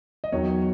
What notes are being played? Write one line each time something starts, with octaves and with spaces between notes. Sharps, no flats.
D#5
E2 D#3 F#3 C#5